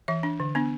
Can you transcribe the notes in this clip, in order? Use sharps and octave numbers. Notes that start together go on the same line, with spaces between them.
E3 E5
D4
D3
B3 D4